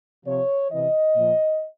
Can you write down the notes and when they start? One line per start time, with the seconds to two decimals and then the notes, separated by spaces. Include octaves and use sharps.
0.25 C3 F3 C#5
0.71 C3 E3 D#5
1.16 A#2 F3